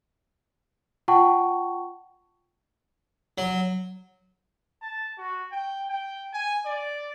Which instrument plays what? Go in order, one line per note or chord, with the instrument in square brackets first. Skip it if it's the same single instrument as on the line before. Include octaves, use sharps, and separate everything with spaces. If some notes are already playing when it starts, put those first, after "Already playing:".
[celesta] F4 F#5 G5 A5 C#6
[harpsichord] F#3
[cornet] A5
F#4
G5
G5
G#5
D5